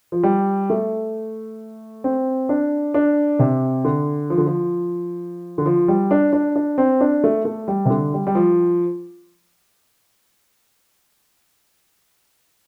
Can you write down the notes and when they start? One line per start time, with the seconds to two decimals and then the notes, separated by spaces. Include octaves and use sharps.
0.12 F3
0.23 G3
0.70 A3
2.04 C4
2.49 D4
2.94 D4
3.39 C3
3.85 D3
4.30 F3
4.38 D3
4.46 F3
5.58 D3
5.66 F3
5.88 G3
6.11 D4
6.33 D4
6.56 D4
6.78 C4
7.01 D4
7.24 A3
7.45 A3
7.68 G3
7.86 C3
7.90 D3
8.14 G3
8.27 G3
8.35 F3